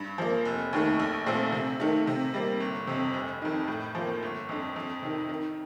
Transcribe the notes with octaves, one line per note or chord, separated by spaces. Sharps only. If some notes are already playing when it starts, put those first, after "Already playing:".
Already playing: G2
F3 A#3
F1
D#2 D#3 A3
A#1
A#2 A3 C4
C3
D#3 A3
C3
G3 A#3
G1
F2 C3
F1
F2 D#3
A2
F3 A#3
G1
F2 D3
F2
C3 D#3
D#3